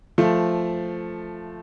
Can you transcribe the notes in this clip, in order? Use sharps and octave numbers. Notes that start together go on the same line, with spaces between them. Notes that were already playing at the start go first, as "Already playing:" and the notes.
F3 A3